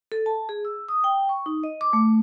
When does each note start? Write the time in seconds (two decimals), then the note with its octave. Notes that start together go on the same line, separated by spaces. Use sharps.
0.12 A4
0.26 A5
0.49 G#4
0.65 E6
0.89 D#6
1.04 G5
1.29 C#6
1.46 D#4
1.64 D#5
1.81 D6
1.93 A3